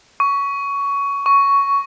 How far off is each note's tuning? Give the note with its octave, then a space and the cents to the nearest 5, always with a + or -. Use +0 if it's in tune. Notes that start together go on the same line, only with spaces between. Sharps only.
C#6 +15
C#6 +10